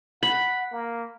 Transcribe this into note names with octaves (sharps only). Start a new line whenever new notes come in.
F#5 B5
A#3